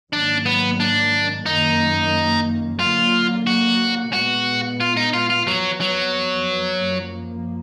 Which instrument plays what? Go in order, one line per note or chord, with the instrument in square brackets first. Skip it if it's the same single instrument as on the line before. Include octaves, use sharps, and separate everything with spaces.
[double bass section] G#2 D#3 F#3 A#3 [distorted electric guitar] D4
[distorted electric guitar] B3
D4
[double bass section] F#2 D#3 A#3 [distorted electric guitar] D#4
[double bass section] D3 F#3 A#3 [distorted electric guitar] F4
[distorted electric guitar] F#4
[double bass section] A#2 G#3 B3 [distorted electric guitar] F#4
[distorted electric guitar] F4
D#4
F4
F4
[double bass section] F2 F3 B3 [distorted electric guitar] F#3
[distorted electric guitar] F#3
[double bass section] F#2 F3 A#3